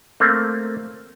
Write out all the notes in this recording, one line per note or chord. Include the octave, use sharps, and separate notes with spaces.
A3 A#3 C4